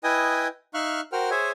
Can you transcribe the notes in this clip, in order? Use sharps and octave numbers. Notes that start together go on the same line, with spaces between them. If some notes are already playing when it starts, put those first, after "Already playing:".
E4 B4 D#5 G5 G#5 D#6
D#4 E5 F5 C#6 F6 F#6
F#4 A#4 C5 F#5 G5 F6
G#4 C5 C#5 E5 G#5